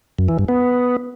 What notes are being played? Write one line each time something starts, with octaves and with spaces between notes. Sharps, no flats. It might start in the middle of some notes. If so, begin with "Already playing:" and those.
F#2
E3
G2
B3